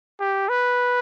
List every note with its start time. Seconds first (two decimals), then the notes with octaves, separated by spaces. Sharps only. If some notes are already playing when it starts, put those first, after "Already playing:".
0.20 G4
0.49 B4